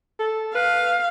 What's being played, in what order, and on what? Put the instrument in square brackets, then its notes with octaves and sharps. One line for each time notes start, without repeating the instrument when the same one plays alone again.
[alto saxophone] A4
[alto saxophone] B4 [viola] F5